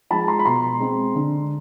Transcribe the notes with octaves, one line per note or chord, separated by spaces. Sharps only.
F3 G#3 A5 B5
A#5 C6
B5
B2 A#5 C6
G#3 C4
D3